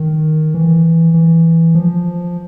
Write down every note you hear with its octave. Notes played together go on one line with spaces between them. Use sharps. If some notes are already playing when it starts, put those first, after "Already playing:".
Already playing: D#3
E3
E3
F3